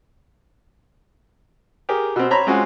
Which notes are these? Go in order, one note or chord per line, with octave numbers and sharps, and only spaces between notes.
G4 G#4 A#4
B2 C4
C5 C#5 A#5 B5
G#3 C4 C#4 F4 F#4 G#4